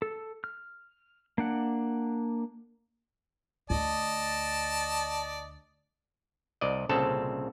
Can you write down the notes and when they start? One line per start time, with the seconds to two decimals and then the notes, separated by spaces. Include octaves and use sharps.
0.02 A4
0.44 F6
1.38 A#3 D4 F#5
3.70 D2 D5 D#5 A5
6.61 C2 D5 D#5
6.89 C2 A#2 C#3 C4 A4 A5